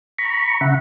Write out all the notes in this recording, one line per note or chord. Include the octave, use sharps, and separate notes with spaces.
A#5 B5 C#6
C#3 E5 F#5